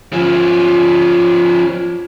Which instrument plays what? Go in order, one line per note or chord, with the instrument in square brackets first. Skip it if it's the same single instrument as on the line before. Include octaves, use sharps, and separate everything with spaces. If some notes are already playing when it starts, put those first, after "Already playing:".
[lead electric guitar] F3 C#4